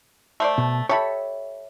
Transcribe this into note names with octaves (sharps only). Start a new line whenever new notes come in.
A3 C5 D5
B2
G4 A4 C#5 E5 B5